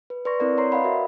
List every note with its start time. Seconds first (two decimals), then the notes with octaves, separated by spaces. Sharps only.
0.10 B4
0.25 B4 D5 C6 C#6 A#6
0.40 C4 E4 A#4 D5
0.57 C#5 A#5 C6 C7
0.72 B4 D#5 F5 F#5 B5
0.84 F#4 A#4 B4 D5 E5